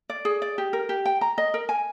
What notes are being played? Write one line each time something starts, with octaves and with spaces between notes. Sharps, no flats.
D5
G#4
D5
G4
A#4
G4
G5
A#5
D#5
A#4
G#5